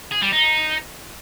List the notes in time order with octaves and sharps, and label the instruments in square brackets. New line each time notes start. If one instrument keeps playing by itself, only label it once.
[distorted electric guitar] G#4
G3
D#4